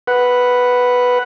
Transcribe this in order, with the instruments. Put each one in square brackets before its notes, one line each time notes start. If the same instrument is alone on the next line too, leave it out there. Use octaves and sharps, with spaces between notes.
[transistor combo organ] B4 F#5